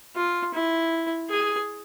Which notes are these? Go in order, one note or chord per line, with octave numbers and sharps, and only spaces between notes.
F4
E4
G#4